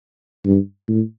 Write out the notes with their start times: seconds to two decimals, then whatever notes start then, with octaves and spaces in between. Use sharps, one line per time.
0.45 G2
0.88 A2